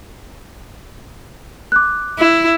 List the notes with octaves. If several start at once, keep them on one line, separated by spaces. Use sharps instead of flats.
D6 F#6
E4